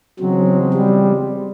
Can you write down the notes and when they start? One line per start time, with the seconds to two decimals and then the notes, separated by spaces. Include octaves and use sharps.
0.20 E2 C#3 F3 F#3 G#3 C4
0.74 G3